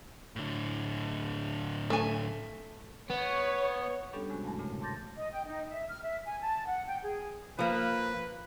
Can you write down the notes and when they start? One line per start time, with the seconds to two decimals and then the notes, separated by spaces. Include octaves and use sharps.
0.36 A2 D3
1.90 A3 G#5
3.10 B3 C#5
4.13 G3 B3 C#4 D4 G4 A4
4.29 G#2 C3 G#3 F#4
4.44 E2 G2 F3 A3
4.59 A#2 C#3 G#3 A3
4.81 A5 C6 D6 G6 A6 A#6
5.16 D#5
5.32 G5
5.46 D#4
5.69 E5
5.88 F6
6.02 E5
6.26 G#5
6.41 A5
6.65 F#5
6.86 G5
7.03 G#4
7.59 F3 A#3 B4